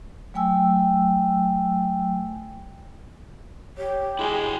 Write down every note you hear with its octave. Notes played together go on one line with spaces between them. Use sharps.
F#3 A3 G5 G#5 E6
G4 C#5
G#3 E4 F#4 G5 G#5